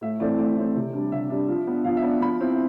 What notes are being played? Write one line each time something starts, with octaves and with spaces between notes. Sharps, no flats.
A2 E5
E3 A3 C4 D5
A2 D5
E3 A3 C4
C3
G3 D4
C3 E5
G3 D4
F3
B3 D4
F3 F5
E5
B3 D4
F3 B5
C4 E4